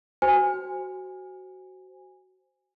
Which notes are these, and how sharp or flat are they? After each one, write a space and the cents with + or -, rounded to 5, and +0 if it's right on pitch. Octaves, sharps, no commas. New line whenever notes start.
F#4 +15 C5 +0 G#5 -15